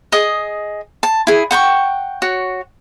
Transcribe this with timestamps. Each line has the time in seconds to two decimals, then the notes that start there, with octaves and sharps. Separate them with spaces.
0.12 G#4 D#5 D#6
1.03 A5
1.27 E4 G#4
1.51 F#5 G5 A#5 C#6
2.22 F#4 C#5